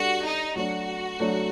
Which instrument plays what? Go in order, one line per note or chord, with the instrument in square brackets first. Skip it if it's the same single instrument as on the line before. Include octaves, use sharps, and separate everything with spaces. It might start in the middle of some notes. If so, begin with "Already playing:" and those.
Already playing: [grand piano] G3 D4 A4 [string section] F#4
[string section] D#4
[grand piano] F#3 A3 D4 [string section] F#4
[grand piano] F#3 A3 D4